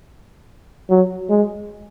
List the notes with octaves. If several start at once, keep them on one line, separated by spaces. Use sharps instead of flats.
F#3
G#3